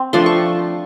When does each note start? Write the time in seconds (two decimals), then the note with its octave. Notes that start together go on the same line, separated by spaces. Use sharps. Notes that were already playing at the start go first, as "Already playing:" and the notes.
Already playing: C4
0.13 F3 A3 D4 C6
0.26 C#6